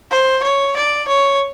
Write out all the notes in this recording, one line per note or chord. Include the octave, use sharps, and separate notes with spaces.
C5
C#5
D5
C#5